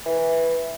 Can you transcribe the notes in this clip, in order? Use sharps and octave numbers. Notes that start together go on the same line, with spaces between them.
E3